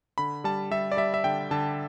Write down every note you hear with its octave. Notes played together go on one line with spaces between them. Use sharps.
D3 B5
G3 A5
G3 E5
D5
G3 E5
E5
D3 G5
D3 A5